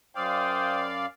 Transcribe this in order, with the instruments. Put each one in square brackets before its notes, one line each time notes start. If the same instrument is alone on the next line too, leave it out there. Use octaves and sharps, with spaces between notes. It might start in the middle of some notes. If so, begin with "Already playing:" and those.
[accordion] F#2 D5 F5 [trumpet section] C5 G5 D#6